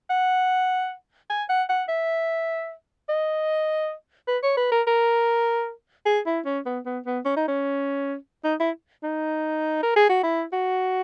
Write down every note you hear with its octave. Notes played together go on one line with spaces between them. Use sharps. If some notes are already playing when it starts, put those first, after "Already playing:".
F#5
G#5
F#5
F#5
E5
D#5
B4
C#5
B4
A#4
A#4
G#4
E4
C#4
B3
B3
B3
C#4
D#4
C#4
D#4
E4
D#4
A#4
G#4
F#4
E4
F#4